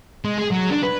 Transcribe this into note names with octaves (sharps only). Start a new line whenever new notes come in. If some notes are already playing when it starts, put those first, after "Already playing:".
G#3
G#4
F#3
D4
B4